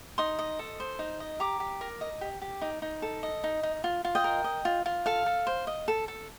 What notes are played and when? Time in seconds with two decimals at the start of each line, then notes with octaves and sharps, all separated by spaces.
0.18 D#4 C6 D#6
0.39 D#5
0.59 A4
0.80 C5
0.99 D#4
1.20 D#5
1.40 G4 A#5 D6
1.60 G4
1.81 A#4
2.01 D#5
2.21 G4
2.42 G4
2.62 D#4
2.82 D#4
3.02 A4
3.23 D#5
3.44 D#4
3.63 D#4
3.84 F4
4.05 F4
4.15 D#5 G5
4.24 A#4
4.44 D#5
4.65 F4
4.86 F4
5.06 A4 F5
5.26 A4
5.47 C5
5.67 D#5
5.88 A4
6.08 A4